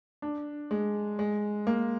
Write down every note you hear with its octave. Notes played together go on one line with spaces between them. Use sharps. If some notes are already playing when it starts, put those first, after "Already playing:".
D4
G#3
G#3
A#3